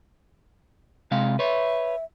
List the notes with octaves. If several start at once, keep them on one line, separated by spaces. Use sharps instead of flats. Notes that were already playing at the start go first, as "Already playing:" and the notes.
C3 G#3 F5
B4 C#5 E5